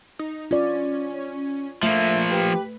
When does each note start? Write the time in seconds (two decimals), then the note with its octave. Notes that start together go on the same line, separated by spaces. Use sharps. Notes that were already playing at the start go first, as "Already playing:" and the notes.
0.19 D#4
0.51 C#4 F4 D5
1.83 F3 A3 A#3 E5
2.32 G4 B4